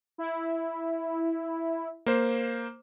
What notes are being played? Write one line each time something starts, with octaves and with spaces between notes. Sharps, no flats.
E4
A#3 C5